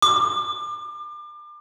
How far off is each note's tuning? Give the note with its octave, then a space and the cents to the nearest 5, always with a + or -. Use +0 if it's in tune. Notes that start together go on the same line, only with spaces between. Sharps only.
D6 +35